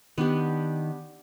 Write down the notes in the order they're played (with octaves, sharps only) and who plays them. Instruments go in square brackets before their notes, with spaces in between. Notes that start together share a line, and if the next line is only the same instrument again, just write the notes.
[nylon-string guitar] D#3 [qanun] B3 D4 G4